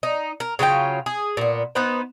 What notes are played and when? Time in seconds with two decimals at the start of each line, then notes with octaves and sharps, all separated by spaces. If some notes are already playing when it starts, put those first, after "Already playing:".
0.03 D#4
0.40 A#4
0.59 C#3 F#3 F4 G5
1.06 G#4
1.37 A#2 B3
1.75 B3 D#4 B4 C5